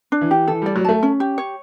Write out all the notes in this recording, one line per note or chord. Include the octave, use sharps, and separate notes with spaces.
D4
E3
G4
E3 A4
G3 D5
F#3
A3 A5
C#4
G4
C#5